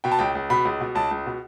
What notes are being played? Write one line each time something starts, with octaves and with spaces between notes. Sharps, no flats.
B2 G5
A5
C#2 G5
C#2
B2 B5
C#2
B2
C#2 A5
C#2
B2